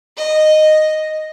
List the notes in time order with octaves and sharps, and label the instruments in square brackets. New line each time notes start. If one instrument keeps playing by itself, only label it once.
[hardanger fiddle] D#5